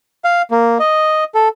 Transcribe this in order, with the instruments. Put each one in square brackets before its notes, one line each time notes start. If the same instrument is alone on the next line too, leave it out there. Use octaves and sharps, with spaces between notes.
[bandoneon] F5
A#3
D#5
A4